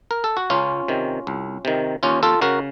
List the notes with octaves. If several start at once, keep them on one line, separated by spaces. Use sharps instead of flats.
A#4
A4
F#4
C#2 C#4 F4
C3 D#3
C2
C3 D#3
D#2 C#4 F4
F4 A4
C#3 F#4 A#4